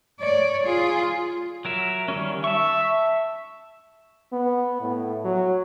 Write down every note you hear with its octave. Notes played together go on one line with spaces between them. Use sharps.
C#5 D5
F4 G#4
F#3 A#4 E5
D#3 G3 C#4
E5 A5 C#6
B3
A2
F#3